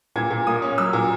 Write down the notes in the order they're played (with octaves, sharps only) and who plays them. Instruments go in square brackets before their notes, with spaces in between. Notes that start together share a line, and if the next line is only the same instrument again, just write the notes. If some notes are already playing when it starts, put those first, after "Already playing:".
[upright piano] A#2 G#6
A#2
A#3 D#6
C#4
F#3 E6
A#2